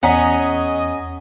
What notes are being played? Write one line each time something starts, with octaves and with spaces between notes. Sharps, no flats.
E2 C#4 G#4 D#5 F#5 A#5 B6